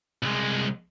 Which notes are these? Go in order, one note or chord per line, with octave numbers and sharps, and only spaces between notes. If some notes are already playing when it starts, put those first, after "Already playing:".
C2 G#3